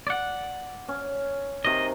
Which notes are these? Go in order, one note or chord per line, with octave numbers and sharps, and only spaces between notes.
D5 F#5
C#4
C3 D#3 D#5